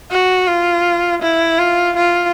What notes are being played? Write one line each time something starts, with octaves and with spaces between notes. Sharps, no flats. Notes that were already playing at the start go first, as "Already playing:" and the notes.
F#4
F4
E4
F4
F4